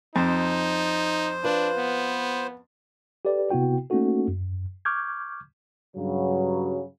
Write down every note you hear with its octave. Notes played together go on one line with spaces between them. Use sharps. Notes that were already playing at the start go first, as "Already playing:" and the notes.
F2 D#4 C5
D4 F4 B4
B3
G4 A4 B4 D5
C3 B3 E4 F#4 G5
A3 A#3 C#4 D#4 F#4 A4
F#2
C#6 D6 F6 G6 G#6
G2 C#3 F#3